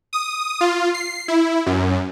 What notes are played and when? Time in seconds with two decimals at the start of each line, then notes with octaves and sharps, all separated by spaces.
0.13 D#6
0.61 F4
0.94 C7
1.28 E4
1.66 F#2